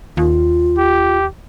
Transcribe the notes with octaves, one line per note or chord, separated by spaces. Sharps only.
D#2 F4
G4